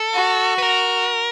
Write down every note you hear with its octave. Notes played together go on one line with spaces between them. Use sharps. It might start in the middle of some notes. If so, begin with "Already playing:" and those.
Already playing: A4
F#4
B4
A#4